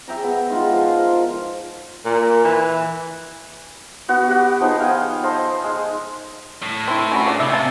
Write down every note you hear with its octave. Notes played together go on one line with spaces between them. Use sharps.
G#4 E5 G5 A#5
B3
G#3 D#4 F4 F#5
F3 C6
A#4
A#2
E3
B3 F#4 F#5
G4 F#5
F3 B3 D#4 G#4
F5 G5 G#5
A4 C5 D#5 F5
G#3
A2
C4 E4
C#4 F#4 B5
C#3 F3 D4
C3 E5
F5 A5